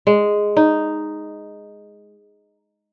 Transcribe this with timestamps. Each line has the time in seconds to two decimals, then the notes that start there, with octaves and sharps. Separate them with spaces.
0.07 G#3
0.57 D#4